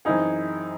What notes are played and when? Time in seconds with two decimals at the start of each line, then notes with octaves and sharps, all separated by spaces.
0.05 F#2 E3 C4 D#4 E4 G#4